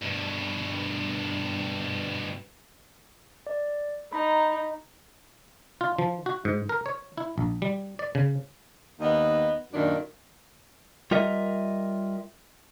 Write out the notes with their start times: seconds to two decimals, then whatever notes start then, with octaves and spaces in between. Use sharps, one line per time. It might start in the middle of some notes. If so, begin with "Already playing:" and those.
0.02 G2 B2
3.47 D5
4.13 D#4 A#5 B5
5.81 F4
5.99 F3
6.26 F#4
6.45 G#2
6.69 A#4
6.86 C#5
7.18 E4
7.38 A#1
7.62 G3
7.99 D5
8.15 C#3
9.00 D#2 B3 D#5
9.73 F#2 A#2 D#3 D4
11.11 G3 F4 A#4 D#5 E5